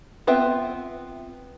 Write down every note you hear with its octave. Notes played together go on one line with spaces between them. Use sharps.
B3 C4 F4 E5 G5